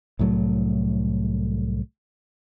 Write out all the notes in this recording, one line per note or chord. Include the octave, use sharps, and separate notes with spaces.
C2 A2 F#3 A3